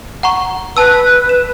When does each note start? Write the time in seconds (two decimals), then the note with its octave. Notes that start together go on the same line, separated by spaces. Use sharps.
0.23 F#5 A#5 C#6
0.77 B4 A5 E6
1.29 E7